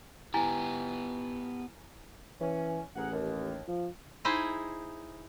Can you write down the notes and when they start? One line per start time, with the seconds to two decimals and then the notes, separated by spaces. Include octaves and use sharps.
0.34 B3 E4 G4 G#5 A#5
2.41 E3 C#4
2.96 A1 G#4 A#4 F#5
3.12 D#2
3.68 F3
4.25 D#4 E4 G#4 C5 D#5